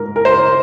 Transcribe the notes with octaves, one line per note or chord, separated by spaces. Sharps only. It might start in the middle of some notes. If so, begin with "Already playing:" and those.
Already playing: G#2 A#4
A#4
C5